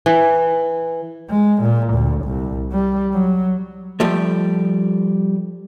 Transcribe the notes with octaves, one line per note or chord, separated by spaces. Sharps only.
E3
G#3
A#2
D2
C2
G3
F#3
F3 G3 A3